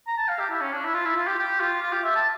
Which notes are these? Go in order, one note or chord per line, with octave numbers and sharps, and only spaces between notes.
A#5
A5
F5
G4
E4
C#4
D4
E4
F4
E4
F4
G4
G4
F4
F4
G4
E5
A5